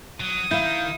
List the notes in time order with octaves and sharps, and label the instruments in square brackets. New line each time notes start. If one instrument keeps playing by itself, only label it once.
[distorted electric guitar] F#3 [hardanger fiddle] D#6
[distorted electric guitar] D#3 [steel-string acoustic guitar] E4 [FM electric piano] F5 G6